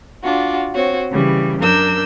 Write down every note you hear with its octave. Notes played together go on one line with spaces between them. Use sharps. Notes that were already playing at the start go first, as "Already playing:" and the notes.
D4 F4 F#4
C4 F#4 C#5
C#3 E3 G3
F#2 D4 A#4 E6 G6